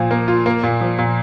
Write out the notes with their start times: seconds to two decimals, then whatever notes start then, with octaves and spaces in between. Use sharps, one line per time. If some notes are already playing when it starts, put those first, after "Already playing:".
Already playing: A#2 F3
0.11 A#3
0.28 F4
0.46 A#3
0.63 A#2
0.81 F3
0.99 A#2